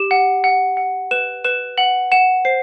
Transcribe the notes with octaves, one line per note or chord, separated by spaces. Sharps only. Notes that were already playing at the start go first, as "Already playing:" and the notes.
Already playing: G4 E7
F#5
F#5
F#5
B4 E7
B4 E7
F#5 F#7
F#5 E7
C5 C7